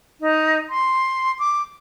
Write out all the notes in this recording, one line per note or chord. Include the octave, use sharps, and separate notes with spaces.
D#4
C6
D6